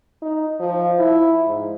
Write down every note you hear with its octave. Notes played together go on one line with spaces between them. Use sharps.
D#4
F3
E4
G#2